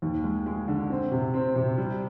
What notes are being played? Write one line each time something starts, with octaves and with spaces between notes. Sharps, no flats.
D#2
G#3
G#3
D3
C4
C3
C4
C3
G3